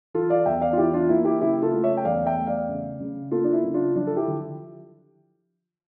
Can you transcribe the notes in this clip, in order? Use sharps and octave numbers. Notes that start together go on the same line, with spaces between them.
E3 F4 A4
D5 F5
E2 E5 G5
D5 F5
F4
E3 E4 G4
D4 F4
A#3 E4
E4 G4
C#3 E4 G4
F4 A4
A3
C#5 E5
G5
E2 D5 F5
E5 G5
A3
D5 F5
C#3
C#3
A#3 F4 A4
D4
E4
C#3
D4 F4
F3 D4 F4
A4
E4 G4
D3